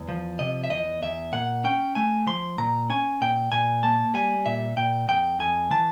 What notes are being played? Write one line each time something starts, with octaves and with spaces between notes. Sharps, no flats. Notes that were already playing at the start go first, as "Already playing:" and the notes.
Already playing: E2
F3
C3 D#5
E5
E2 D#5
E2 E5
A#2 F#5
C#4 G5
A3 G#5
F3 C6
A#2 A#5
C#4 G#5
A#2 G5
A#2 G#5
A#3 A5
G3 G#5
A#2 E5
A#2 G5
F2 G5
F2 G#5
E3 A5